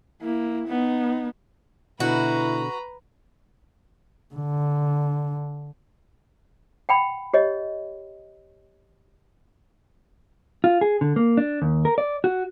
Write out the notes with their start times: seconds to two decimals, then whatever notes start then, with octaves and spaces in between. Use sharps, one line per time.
0.21 A#3 E4
0.68 B3 D#4
2.00 B2 D3 E4 F#4 B4 A#5
4.34 D3
6.89 F#5 G5 B5
7.34 G4 C#5 D#5
10.64 F4
10.81 G#4
11.01 D3
11.16 A#3
11.37 D4
11.62 D#2
11.85 A#4
11.98 D5
12.24 F#4